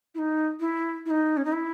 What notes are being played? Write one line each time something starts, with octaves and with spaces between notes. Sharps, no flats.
E4
D#4
E4
E4
D#4
C#4
D#4
E4